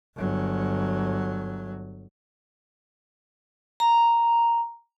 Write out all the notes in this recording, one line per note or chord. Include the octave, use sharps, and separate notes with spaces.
G1 F#3
A#5